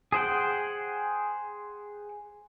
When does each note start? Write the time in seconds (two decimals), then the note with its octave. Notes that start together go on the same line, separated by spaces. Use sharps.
0.12 G#4 C5 F#5 G5